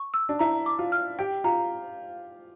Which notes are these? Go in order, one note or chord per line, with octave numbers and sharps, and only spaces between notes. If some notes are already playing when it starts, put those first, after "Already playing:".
Already playing: C#6
E6
D4
E4 A#5
D6
F4
F6
G4 G5
F4 A#5